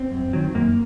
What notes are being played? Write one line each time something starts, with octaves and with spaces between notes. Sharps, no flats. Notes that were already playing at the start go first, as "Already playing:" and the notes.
Already playing: C4
F#2
D#3 F#3
F#2 A#3